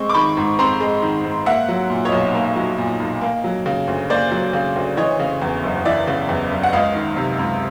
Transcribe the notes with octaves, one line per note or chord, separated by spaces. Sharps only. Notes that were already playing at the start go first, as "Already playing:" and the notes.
Already playing: G#3 C4 C#6
D6
D#3 B5 C#6
G#2
C4 A#5 C6
G#3
D#3
G#2
A#3 E5 F#5
F#3
A#2
C#5 D#5
B1
A#3
F#3
A#2
B1
A#3
F#3
C#3
D2
A#3 C5 D5
F#3
C#3
D2
E3 C#5 D#5
C#3
E2
F#1
E3 D5 E5
C#3
E2
F#1
F#5
C#2 D#5 F5
D#3
C3
C#2